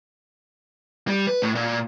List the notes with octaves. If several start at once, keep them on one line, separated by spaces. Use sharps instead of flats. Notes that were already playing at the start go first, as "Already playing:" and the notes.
G3
B4
A2
A#2